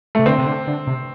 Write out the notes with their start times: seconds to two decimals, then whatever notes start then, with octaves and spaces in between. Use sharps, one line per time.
0.15 C3 A3
0.26 D3 C4
0.38 C3
0.46 D3
0.67 D3
0.87 C3